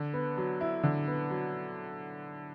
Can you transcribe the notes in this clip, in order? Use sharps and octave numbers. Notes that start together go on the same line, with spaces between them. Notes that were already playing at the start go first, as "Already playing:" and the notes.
Already playing: D3
B3
F#3
E4
D3
B3
F#3